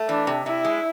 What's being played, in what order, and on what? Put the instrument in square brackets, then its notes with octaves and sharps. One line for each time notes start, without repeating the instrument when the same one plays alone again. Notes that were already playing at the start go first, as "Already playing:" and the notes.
Already playing: [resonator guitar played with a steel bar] A3
[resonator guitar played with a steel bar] E3 [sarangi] D4
[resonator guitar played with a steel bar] C3
[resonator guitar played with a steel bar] C3 [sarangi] E4
[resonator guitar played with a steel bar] G#3